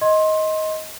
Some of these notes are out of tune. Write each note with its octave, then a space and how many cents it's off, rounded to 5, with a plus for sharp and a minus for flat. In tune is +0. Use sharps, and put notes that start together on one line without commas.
D#5 +15 C6 +20